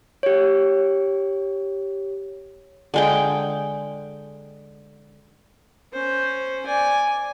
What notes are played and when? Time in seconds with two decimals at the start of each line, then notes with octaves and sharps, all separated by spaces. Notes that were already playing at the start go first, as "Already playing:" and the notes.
0.23 G4 C#5
2.94 D3 G#3 G5
5.93 C#4 C5
6.66 D5 G#5